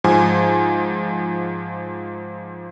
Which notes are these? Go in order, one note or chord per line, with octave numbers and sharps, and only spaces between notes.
G#2 F3 G#5